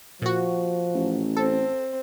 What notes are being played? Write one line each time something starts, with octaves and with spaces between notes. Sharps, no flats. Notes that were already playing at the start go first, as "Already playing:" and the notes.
A#2 F3 F#4
A1
C4 A4